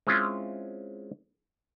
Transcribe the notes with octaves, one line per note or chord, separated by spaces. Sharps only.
G#3 C4 C#4 E4 F4